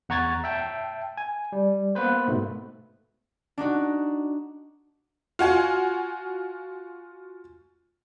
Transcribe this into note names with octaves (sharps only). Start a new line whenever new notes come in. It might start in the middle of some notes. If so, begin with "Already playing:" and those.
E2 F#5 A#5 C#6 G#6 A6
E5 G5 A5
G#5
G3
A#3 B3 B4 C5
G#2 B2 A3
D4 D#4 F#4
F4 F#4 G#5